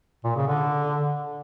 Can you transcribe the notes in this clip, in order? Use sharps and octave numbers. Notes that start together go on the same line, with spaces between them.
A#2
C#3
D3